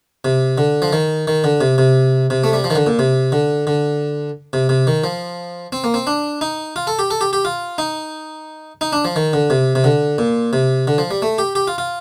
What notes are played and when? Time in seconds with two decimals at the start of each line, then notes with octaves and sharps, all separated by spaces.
0.25 C3
0.58 D3
0.82 F3
0.93 D#3
1.27 D#3
1.44 D3
1.61 C3
1.78 C3
2.30 C3
2.44 A3
2.53 G3
2.64 F3
2.70 D#3
2.75 D3
2.87 A#2
2.99 C3
3.32 D3
3.67 D3
4.53 C3
4.69 C3
4.87 D#3
5.04 F3
5.72 C4
5.84 A#3
5.94 C4
6.07 D4
6.41 D#4
6.76 F4
6.87 A4
6.99 G4
7.11 A4
7.21 G4
7.33 G4
7.45 F4
7.78 D#4
8.81 D#4
8.93 D4
9.05 F3
9.16 D#3
9.33 D3
9.50 C3
9.75 C3
9.84 D3
10.18 A#2
10.53 C3
10.87 D3
10.98 F3
11.11 G3
11.22 A3
11.38 G4
11.55 G4
11.67 F4
11.78 F4